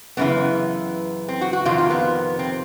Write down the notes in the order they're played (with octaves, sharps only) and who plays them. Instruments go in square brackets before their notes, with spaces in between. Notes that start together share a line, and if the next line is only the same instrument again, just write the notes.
[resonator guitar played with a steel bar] F#2 C#3 E3 B3
C4
F#4
F#4
F2 C3 D#3 F4
F4
B3
C4